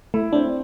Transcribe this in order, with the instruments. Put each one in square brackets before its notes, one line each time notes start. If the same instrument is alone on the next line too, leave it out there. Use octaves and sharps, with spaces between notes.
[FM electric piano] A3 [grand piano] E4
[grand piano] C4 [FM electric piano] D4